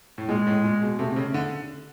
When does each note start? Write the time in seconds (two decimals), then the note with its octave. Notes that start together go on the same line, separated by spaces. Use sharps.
0.18 A2
0.29 A#2 G#3
0.47 A2
0.64 A#2
0.82 B2
0.99 C3 A3
1.12 C3
1.16 C#3
1.34 D3